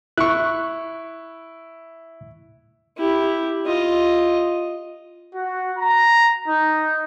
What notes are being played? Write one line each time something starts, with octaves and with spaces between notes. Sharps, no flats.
E4 C#6 F#6
E4 G4
F4 D#5
F#4
A#5
D#4